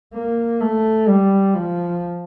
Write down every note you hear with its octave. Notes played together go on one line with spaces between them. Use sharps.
A#3
A3
G3
F3